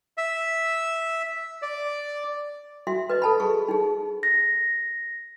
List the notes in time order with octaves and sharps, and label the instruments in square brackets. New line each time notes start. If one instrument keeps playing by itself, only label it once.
[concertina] E5
D5
[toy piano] F#4 E5 C6
B4 D#5
A4 A5 B5
G#4 C#6
D#4 G#4
[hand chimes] A#6